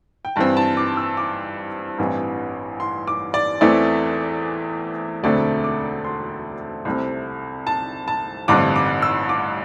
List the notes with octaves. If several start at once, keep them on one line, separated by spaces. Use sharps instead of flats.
G5
G2 E3 C4 A5
A5
D6
E6
D6
A1 G2 E3 C4
C6
D6
D5
E2 E3 A3 C4 D5
E1 D2 D3 A3 C4 D5
D6
C6
C2 C3 A3 C4
A5
A5
A1 G2 D3 C4 D6
D6
E6
D6